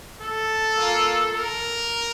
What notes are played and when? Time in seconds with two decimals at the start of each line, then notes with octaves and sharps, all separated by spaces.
0.21 A4
0.77 A#3 F4
1.33 A#4